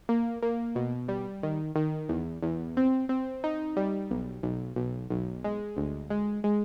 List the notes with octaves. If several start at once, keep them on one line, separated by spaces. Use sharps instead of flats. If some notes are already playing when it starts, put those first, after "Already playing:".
A#3
A#3
B2
G3
D#3
D#3
E2
E2
C4
C4
D#4
G3
B1
B1
B1
B1
G#3
D2
G#3
G#3